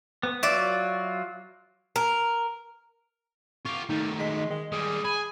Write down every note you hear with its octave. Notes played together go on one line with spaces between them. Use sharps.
B3
F#3 F4 F#4 D5 E5
A#4
F4 G4 C#6
D#3 A3 D#4
G#3 B6
D#3 G#3
G3 G#3 G#4
G#5 B5